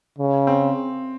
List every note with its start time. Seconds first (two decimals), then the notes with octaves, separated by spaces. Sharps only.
0.18 C#3
0.47 C4